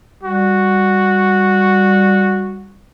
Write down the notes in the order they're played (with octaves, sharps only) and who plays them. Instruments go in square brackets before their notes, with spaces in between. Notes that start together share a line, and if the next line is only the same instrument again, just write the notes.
[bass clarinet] G3 [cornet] F#4